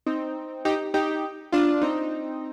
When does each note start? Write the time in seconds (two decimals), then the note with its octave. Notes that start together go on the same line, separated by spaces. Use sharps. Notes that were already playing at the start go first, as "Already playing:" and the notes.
0.06 C4 D#4
0.65 D#4 G4
0.94 D#4 G4
1.52 D4 F4
1.82 C4 D#4